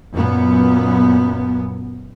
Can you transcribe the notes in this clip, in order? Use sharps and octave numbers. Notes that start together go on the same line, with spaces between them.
F#2 A#2 B3